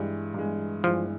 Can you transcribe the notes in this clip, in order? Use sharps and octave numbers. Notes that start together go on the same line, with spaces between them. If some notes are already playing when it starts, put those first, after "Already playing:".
Already playing: G2 E3 G3 G#3
G2 E3 G#3
G2 E3 F3 G#3